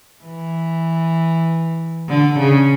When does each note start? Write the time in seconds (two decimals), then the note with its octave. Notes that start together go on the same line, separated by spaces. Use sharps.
0.24 E3
2.08 D3
2.39 C#3